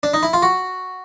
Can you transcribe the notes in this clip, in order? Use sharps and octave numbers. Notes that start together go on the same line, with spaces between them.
D4
D#4
E4
F4
F#4